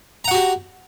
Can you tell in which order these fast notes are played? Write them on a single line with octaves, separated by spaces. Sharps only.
A#5 F#5 F#4 G4